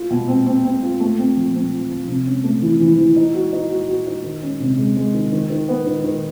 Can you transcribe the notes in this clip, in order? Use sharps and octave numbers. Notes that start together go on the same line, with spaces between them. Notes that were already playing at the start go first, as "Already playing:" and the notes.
Already playing: F4
B2
C4
C4
C4
F4
A3
C4
F3
C4
F3
F3
C3
C#4
A3
E3
E3
E3
D#4
F#4
D#4
F#4
F#4
D#4
D#3
C#4
C3
G#3
G#3
D#3
D#3
D#3
B3
D#3
D#3